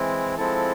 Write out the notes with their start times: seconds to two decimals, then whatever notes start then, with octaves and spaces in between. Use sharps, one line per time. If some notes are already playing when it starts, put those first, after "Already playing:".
Already playing: E3 G#3 C4 E4
0.38 F3 G#3 C4 E4 A4